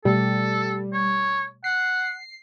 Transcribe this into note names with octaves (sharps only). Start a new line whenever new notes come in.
B2 G3 A3 A4
C#5
F#5 C7